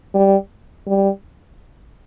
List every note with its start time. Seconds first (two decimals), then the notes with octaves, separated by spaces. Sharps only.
0.14 G3
0.87 G3